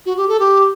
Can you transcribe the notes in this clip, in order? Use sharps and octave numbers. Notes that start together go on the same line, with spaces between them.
F#4
G4
A4
G4